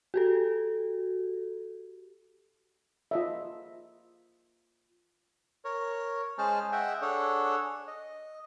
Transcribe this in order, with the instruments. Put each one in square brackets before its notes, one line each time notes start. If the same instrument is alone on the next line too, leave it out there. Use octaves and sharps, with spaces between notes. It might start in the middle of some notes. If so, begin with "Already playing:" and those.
[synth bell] F#4 G4 A4
[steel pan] F4 D#5 E5
[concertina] A#4 C#5
G#3 C#4 G#4 C5 A5 F6
G#4 D#5 E5 F#5 G5
D4 G#4 A4 C#5 F#5
D#5